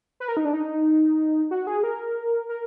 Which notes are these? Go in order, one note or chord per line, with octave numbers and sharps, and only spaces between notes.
B4
A#4
D#4
D4
D#4
F#4
G#4
A#4
A#4